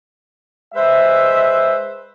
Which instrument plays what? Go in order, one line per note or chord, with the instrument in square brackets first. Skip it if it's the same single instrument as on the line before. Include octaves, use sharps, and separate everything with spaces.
[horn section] G#3 B4 C5 E5